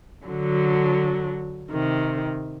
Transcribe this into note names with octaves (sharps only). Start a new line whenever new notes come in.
D3 F#3
C3 D#3